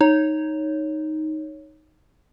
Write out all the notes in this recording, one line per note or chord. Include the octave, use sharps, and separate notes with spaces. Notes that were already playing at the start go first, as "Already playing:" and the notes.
D#4 C#5